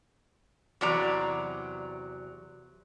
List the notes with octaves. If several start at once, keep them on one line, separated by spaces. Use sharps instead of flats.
E2 C3 F#3 D5 A#5